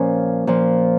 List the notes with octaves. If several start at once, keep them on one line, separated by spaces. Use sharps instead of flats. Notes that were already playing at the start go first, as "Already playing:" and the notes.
Already playing: A#2 F3 C#4
A#2 F3